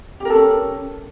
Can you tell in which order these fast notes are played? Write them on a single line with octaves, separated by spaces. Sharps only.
G4 A#4 A4 C#4